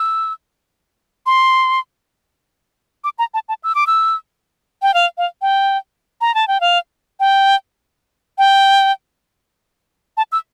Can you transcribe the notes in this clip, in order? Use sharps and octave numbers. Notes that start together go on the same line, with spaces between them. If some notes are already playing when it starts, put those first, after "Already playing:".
Already playing: E6
C6
D6
A#5
A5
A5
E6
D6
E6
G5
F5
F5
G5
A#5
A5
G5
F5
G5
G5
A5
E6